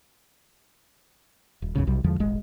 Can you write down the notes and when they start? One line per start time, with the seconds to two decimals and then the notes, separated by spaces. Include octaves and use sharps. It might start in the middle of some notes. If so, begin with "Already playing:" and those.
1.62 D#1
1.75 B1 E2 G#2 C#3
1.87 B1 C3 G3
2.04 E2 D3 F3 G#3
2.20 D#1 G#1 G#3